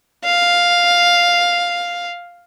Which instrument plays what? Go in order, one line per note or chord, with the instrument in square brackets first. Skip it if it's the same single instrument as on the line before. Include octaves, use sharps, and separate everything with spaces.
[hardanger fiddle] F5